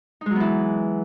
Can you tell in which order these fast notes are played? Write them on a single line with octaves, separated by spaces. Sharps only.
D#4 G#3 F#3 B3 E3